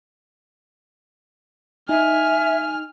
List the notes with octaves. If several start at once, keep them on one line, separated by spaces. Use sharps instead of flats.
D#4 E5 G#5 F6